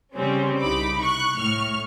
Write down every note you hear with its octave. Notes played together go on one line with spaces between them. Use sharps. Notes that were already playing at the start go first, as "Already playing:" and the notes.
C#3 G3 C4 C#4
C2 D#4 B5 D6
C#6 F#6
A2 C#6 F6